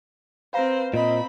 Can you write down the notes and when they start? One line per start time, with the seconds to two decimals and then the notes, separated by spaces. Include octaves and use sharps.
0.53 C4 B4 C5 F5 A#5
0.94 A#2 C4 D#5 B5